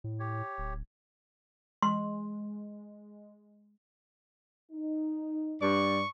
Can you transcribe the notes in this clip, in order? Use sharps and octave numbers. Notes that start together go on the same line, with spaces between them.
A2
G4 C#5
D1
G#3 C6
D#4
G2 D5 C#6